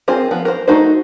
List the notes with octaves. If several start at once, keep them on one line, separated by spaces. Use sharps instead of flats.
C4 F4 G#4 A#4 C5
F3 B3
A#4 C5
A3 D#4 F#4 C5